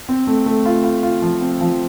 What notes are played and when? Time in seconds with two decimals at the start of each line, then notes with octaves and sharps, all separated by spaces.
0.09 C4
0.27 A3
0.46 A3
0.65 F4
0.84 F4
1.03 F4
1.22 F3
1.41 C4
1.61 F3